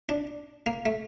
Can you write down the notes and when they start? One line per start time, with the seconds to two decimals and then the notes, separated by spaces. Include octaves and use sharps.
0.09 D4
0.66 A#3
0.86 A3